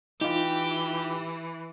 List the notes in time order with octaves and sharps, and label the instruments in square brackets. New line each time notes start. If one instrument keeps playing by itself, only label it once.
[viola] E3 [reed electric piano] D#4 F4 [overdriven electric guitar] G4